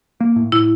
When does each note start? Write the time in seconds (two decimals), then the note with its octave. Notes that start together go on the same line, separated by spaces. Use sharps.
0.20 A#3
0.36 A2
0.52 A2 E4